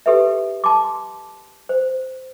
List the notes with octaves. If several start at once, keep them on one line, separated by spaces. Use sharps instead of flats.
G4 A4 B4 E5
A5 C6 D6
C5